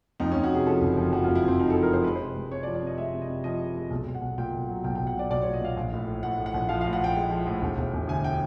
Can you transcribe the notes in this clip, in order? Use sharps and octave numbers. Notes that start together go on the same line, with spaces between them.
F2 D#4
F2 C#4
F#4
C3 G#4
F3 A4
F#1
F3
F3 F#4
F2 F4
E4
F2 C4
F3 D#4
A4
F3
A#4
F3 C5
G#3 B4
C5
C3
G#3
C3 C#5
D5
F3
D5
C3 D#5
G#3 E5
C3
D#5
C3
F3 D#5
G#3
G#3
B1
B1
F#5
B1
A#2 G5
B1
F#3
B1 G5
B1 G5
F#5
F#3 D5
B1 D5
A#2 C#5
D#5
A#2 F5
A#1
A2
A2
A2 F#5
A2
F#5
A#1
F3 F5
A2 F5
F#5
A#1 G5
G#3
F3
A2
E1
E1
E1
D2 G#5
G5